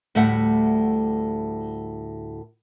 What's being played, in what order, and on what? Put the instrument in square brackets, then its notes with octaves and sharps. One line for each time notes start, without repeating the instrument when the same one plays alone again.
[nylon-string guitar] D2 A2 G3 A3 E5 F#5